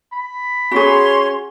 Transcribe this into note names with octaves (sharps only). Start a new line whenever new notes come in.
B5
C#4 F#4 G#4 C6